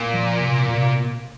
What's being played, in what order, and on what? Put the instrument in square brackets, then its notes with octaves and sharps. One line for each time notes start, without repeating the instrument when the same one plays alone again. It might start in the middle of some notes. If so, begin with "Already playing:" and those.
Already playing: [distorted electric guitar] A#2
[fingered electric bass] F3
C3
C3